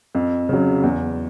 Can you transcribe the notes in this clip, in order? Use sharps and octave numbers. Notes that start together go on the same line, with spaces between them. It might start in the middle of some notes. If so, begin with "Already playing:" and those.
F2
C#3 F#3
E2